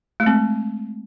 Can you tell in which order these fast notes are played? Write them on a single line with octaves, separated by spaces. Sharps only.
A3 G#3 C4